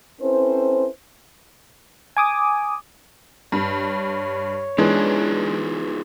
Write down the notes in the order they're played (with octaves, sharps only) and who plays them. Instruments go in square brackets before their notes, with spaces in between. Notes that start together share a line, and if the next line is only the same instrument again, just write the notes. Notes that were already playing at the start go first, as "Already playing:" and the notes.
[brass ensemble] C4 C#4 E4 A4 B4 C5
[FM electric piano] G#5 D6 D#6
[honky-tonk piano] G2 [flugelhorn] C#5
[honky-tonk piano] E3 [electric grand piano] G#3 D4 [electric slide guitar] D#4 F4 G#4